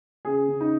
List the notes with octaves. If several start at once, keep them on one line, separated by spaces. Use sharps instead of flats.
C#3 G#4
C#3
D#4